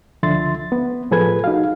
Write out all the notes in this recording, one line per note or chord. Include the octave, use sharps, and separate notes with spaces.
C#2 D3 F3 E5 C6 A6
B3
A2 F3 G#4 A4 B4 G#6
D#4 F#4 F5